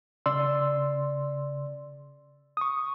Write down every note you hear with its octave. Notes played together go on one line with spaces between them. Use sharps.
C#3 D5 C6 E6
C#6 D#6